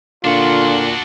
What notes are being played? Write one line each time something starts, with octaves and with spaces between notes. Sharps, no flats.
A#2 D3 D4 F4 F#4